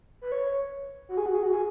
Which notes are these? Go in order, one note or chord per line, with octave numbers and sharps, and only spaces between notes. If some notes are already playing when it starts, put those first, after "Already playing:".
B4
C#5
F#4
G#4
F#4
G#4
F#4
G#4